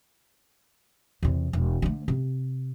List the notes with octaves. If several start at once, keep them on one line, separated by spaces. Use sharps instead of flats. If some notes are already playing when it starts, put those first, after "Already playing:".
E2 C3
E1
D3 A3
C3